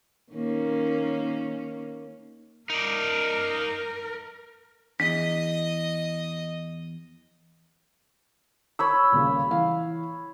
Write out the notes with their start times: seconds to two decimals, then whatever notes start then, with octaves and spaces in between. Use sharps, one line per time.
0.33 D#3 A#3 C#4
2.70 D#4 A#4 D5
5.00 E2 D#5 D#6 B6
8.79 C#5 B5 E6
9.12 D#1 A#2 C#3
9.51 E3 F5